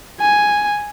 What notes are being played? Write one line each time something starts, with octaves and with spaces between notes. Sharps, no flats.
G#5